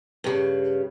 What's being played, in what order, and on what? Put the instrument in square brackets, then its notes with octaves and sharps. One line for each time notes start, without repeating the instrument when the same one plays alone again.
[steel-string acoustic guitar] G2 C#3